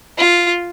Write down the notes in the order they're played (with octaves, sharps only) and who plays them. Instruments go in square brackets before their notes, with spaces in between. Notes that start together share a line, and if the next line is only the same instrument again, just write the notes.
[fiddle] F4